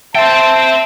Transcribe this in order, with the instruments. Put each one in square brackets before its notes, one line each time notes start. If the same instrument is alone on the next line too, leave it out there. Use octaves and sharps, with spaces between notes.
[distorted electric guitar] C5 G5 [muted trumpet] E5 [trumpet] A5